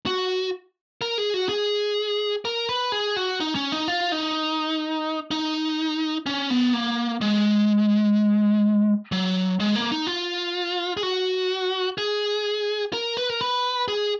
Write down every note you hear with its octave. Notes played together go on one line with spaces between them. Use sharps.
F#4
A#4
G#4
F#4
G#4
A#4
B4
G#4
F#4
D#4
C#4
D#4
F4
D#4
D#4
C#4
B3
A#3
G#3
F#3
G#3
A#3
D#4
F4
G#4
F#4
G#4
A#4
B4
A#4
B4
G#4